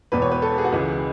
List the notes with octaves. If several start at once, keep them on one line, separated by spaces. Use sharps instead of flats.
E1 E2 B2 B4
C#5
B4
A4
G#4
F#4
C#2 C#3 E3 G#3 G#4